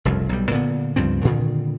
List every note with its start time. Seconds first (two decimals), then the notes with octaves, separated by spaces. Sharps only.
0.05 F1 C2 F#2
0.29 B1 G3
0.51 A#2 D3 B3
0.96 C#2 G2 F3 C4
1.25 A#2 D3 D#3